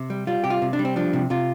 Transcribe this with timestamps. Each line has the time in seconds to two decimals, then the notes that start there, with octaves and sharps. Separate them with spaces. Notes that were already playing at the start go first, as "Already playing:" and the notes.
Already playing: C3
0.10 G3
0.27 G3 F4
0.44 C3 G4
0.50 F4
0.62 C3
0.73 D4
0.79 G3
0.85 C4
0.96 F3 D4
1.13 C3
1.30 C3 F4